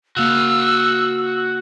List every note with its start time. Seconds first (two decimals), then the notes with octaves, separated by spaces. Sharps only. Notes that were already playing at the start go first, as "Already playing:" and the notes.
0.17 C#3 A#3 F#4 F5 E6